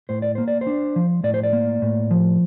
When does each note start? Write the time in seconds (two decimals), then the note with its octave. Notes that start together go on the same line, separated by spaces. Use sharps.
0.09 A2 C5
0.22 D5
0.35 A#3 C5
0.48 D5
0.61 C5
0.67 D4
0.96 F3
1.24 A2 D5
1.34 C5
1.43 D5
1.53 A#3
1.82 A2
2.11 F3